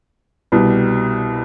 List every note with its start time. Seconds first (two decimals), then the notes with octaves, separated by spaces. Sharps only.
0.52 C2 B2 G3